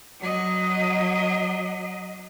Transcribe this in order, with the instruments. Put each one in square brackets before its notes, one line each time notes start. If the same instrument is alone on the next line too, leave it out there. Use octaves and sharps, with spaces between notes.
[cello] F#3 D#5